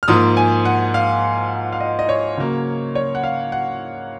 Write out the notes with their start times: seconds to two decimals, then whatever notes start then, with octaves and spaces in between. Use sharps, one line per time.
0.03 F6
0.08 G#2 F3 A#3 D#6
0.37 G#5
0.65 F#5
0.94 F5
1.72 F5
1.80 D#5
1.99 D#5
2.09 C#5
2.37 C#3 F#3 A#3
2.95 C#5
3.15 F#5
3.23 F5
3.52 F#5